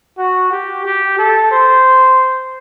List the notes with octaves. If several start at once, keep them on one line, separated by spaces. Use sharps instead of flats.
F#4
G4
G4
A4
C5